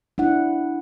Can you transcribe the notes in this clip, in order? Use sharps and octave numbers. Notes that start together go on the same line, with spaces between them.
D4 E4 F#5